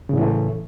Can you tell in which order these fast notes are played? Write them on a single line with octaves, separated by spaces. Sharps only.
C#3 A2 E3 A3